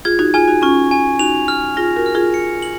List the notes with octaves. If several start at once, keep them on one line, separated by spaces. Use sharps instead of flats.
F4 G#4 G#6
D#4 F#4
F4 G#4 G#5
D#4 F#4
C#4 F4 C#6
G#5
D#4 F#4 F7
F6
F4 G#4 A#6
F#4 A#4
F6
F4 G#4
C#7
F#7